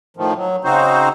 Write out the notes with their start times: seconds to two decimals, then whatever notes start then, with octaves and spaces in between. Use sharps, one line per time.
0.17 A2 D#3 F3
0.37 F#3
0.64 C#3 C4 D#4 F#4 C5